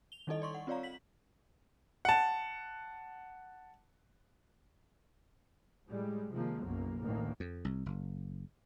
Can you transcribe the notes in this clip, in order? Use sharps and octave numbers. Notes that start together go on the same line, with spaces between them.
F7 G7
D#3 G3 D#4 E4 A4 D#5
D5 C6 C#6
F#5
C4 F4 C#5 D5 F5 A#5
B6 F#7
F#5 A5
A2 G3 G#3
C3 D#3 F3 G#3 A#3
F#1 B1 F#2 B2 A#3
A1 D2 A2 D#3 E3 A#3
F2
C2
F#1